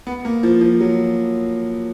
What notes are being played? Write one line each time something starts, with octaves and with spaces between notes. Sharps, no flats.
B3
A#3
F3
F3
F#3